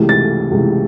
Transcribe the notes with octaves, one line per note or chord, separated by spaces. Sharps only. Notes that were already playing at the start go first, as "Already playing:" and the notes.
Already playing: C#2 C3 E3 A3
A6
C#2 C3 E3 A3